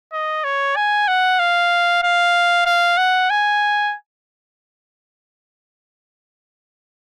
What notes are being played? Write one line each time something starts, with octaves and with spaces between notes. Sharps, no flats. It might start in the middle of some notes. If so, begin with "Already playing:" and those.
D#5
C#5
G#5
F#5
F5
F5
F5
F#5
G#5